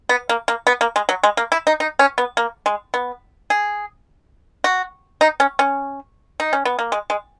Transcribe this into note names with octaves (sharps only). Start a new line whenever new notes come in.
B3
A#3
A#3
B3
A#3
G#3
F#3
G#3
A#3
E4
D#4
D#4
C#4
B3
A#3
G#3
B3
G#4
F#4
D#4
C#4
C#4
D#4
C#4
B3
A#3
G#3
G#3